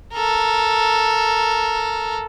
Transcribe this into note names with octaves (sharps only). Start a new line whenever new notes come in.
A4 A#4